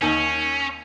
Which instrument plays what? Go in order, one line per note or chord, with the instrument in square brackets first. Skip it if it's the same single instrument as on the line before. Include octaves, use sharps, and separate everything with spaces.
[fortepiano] D#2 D#3 G#5 [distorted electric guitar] C#4